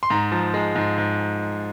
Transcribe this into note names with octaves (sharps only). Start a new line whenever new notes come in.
C6
G#2 A#5
F3
G#3
G#2
G#2